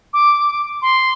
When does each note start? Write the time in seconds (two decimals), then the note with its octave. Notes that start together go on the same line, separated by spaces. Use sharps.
0.13 D6
0.82 C6